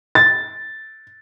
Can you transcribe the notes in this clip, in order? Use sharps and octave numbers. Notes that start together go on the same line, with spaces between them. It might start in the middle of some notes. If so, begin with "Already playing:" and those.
A6